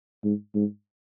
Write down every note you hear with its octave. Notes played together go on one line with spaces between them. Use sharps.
G#2
G#2